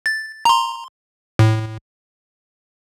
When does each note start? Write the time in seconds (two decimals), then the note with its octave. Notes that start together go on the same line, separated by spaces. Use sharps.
0.06 A6
0.45 A#5 C6
1.39 A2